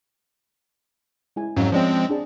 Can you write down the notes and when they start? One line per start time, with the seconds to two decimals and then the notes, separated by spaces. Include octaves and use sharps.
1.36 G#3 E4 G#5
1.56 F2 G#2 F#3 C#4 F5
1.72 F3 G#3 C4 C#5 D5
2.09 D4 G#4 A5